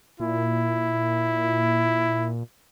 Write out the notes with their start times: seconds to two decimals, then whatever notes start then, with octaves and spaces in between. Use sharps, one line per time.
0.20 A#2 E4